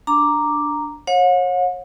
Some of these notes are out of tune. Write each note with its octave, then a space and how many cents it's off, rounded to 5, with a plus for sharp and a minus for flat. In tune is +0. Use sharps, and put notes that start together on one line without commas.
D4 +0 A#5 +0 D6 +0
C#5 -30 F#5 -45